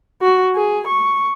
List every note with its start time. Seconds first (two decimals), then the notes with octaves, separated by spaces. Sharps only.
0.21 F#4
0.55 G#4
0.88 C#6